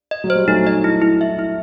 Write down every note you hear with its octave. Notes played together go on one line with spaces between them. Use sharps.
D#5
F#3
C5
G3
F#3 A3 D#4
D#5
E4
E4
E5
E4